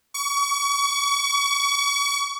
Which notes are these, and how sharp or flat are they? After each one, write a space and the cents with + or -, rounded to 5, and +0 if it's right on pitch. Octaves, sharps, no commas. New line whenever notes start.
C#6 +35